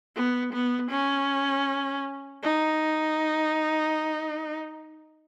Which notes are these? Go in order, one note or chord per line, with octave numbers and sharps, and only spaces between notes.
B3
B3
C#4
D#4